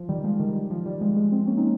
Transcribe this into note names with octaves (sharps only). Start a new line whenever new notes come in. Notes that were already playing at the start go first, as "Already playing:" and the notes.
Already playing: F3
D#3 G3
F3 G#3
D#3 G3
D#3
F3
D#3 G3
F3 G#3
F3 G#3
G#3 C4
A#3 C#4
C4 D#4